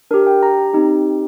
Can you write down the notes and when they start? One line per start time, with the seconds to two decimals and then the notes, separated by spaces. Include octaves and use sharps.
0.11 D4 G4 A#4
0.27 G5
0.43 A#5
0.73 C4 D#4 G4